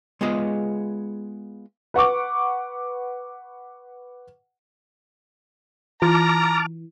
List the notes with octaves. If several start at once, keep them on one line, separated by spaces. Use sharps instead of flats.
G#3 B3 F4 G#4 D#5
B4 F#5 C#6 D6
E3 F4 A5 A#5 D6 F6